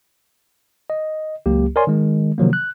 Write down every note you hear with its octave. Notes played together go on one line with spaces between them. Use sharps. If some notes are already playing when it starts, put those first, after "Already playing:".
D#5
C#2 F#3 A#3 G4
A#4 C#5 D5 G#5 C6
D#3 G#3
C3 D#3 F3 F#3 A#3
F#6